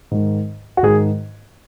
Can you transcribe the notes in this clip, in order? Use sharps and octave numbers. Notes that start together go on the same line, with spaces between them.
G#2 D#3
F#4
G#2 D#3 G#4